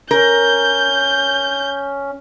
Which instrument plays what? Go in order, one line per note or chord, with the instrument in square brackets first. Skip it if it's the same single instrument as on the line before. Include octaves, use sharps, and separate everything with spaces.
[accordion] C#4 [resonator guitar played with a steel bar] A#4 [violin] G6